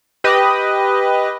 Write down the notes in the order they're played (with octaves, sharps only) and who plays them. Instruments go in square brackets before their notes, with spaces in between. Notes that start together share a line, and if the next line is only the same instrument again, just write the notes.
[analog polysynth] G4 B4 D#5